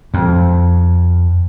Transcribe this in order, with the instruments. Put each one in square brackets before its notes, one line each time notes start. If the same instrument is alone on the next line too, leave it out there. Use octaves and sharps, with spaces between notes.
[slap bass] F2